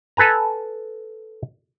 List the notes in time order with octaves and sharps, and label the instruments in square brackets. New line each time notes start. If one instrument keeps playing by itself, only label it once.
[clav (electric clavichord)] A4 B4 G#5 A#5